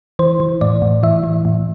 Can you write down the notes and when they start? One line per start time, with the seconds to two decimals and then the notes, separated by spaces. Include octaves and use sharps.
0.19 E3 C5
0.40 E3
0.61 A2 D5
0.82 A2
1.03 E3 E5
1.24 E3
1.45 A2